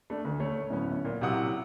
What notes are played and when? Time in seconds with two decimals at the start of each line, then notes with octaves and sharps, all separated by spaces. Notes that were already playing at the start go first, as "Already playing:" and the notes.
0.10 A3 D4
0.25 D2
0.40 A3 C#5
0.70 D1 B3 C#4
1.05 A#2
1.21 C3 F#3 E4 F#5 D#6